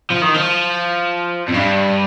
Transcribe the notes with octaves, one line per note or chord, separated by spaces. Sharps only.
F3
D#3
F3
F2
G2